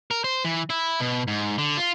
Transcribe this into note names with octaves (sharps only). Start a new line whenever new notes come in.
A#4
C5
E3
E4
B2
G#2
D3
F4